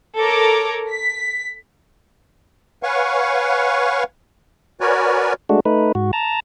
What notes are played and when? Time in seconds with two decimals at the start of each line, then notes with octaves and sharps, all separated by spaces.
0.18 A4 A#4 C#5 A#5 D6
0.89 B6
2.83 B4 C#5 F5 F#5 G#5 C#6
4.81 F#4 A#4 B4 C#5 D5 G#5
5.49 G#3 A3 D4 F#4
5.65 A3 D#4 B4
5.95 G#2 F#4
6.13 A5 A#5